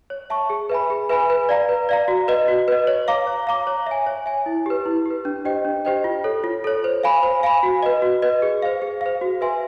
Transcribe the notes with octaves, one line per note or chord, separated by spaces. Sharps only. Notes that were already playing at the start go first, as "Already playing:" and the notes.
C#5
E5 A5 C#6
G#4
B4 E5 G#5 B5
G#4
B4 E5 G#5 B5
B4
D5 F5 A#5
B4
D5 F5 A#5
F#4
B4 D#5
F#4
B4 D#5
C#5
F5 A#5 D6
C#5
F5 A#5 D6
C#5
E5 G#5
C#5
E5 G#5
E4
G4 B4
E4
G4 B4
D4
G4 C5 D#5 G5
D4
G4 C5 D#5 G5
F4
A4 C#5
F4
A4 C#5
C5
F5 G#5 B5
C5
F5 G#5 B5
F#4
B4 D#5
F#4
B4 D#5
G#4
C5 F5
G#4
C5 F5
F#4
B4 E5 G#5 C6